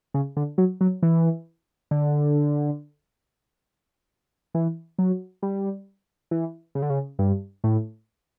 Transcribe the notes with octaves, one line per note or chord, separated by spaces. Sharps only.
C#3
D3
F#3
F#3
E3
D3
E3
F#3
G3
E3
C#3
D3
C#3
G2
A2